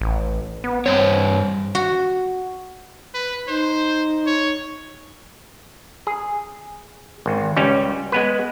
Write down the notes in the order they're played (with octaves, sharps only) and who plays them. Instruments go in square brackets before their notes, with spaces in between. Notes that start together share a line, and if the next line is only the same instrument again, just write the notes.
[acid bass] A1
B3
[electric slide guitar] G2 C#5 [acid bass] C4
[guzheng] F#4
[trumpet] B4
[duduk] D#4 [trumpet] C5
[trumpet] C#5
[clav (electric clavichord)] G#4
G#1
C#2 G3 C#4
G#3 B3 B4